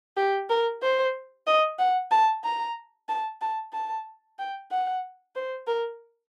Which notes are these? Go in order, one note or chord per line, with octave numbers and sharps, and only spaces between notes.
G4
A#4
C5
D#5
F#5
A5
A#5
A5
A5
A5
G5
F#5
C5
A#4